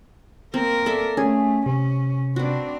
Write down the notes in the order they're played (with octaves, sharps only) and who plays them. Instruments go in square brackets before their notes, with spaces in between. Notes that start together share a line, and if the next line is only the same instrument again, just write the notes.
[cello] A#3 A#4 [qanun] C4
[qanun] A4 D5 E5
[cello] A3 [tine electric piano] C#4 [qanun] G#4
[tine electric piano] C3 [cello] C#4
[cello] C4 D4 [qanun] F#4 B4